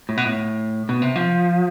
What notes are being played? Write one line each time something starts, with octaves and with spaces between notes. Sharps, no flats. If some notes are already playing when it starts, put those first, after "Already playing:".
A2
B2
A2
B2
C3
F3